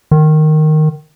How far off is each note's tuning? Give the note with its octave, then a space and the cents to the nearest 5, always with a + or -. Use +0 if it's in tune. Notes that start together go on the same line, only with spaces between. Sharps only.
D#3 -10